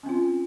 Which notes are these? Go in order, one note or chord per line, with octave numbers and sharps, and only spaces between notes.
C4 C#4 F4